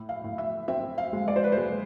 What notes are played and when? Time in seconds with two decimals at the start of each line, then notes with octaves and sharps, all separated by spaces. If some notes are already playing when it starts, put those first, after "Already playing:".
Already playing: A2
0.09 F5
0.24 A2
0.38 E5
0.68 C4 E5
0.98 F5
1.13 G#3
1.28 D5
1.36 C5
1.44 B4
1.52 C5
1.57 G#3